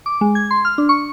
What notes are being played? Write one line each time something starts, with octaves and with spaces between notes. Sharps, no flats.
D6
G#3
G#6
C6
F6
D4
C#6